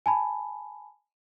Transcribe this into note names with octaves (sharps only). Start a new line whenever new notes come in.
G#5 A5 B5